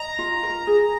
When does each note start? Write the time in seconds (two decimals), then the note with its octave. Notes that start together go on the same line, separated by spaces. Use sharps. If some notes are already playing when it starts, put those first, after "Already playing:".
Already playing: D#5 A#5
0.19 F4
0.43 A#4
0.67 G#4